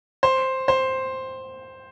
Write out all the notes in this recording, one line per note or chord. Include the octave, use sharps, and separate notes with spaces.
C5
C5